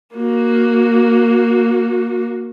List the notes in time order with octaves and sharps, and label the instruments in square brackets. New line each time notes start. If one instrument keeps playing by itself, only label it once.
[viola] A#3 F#4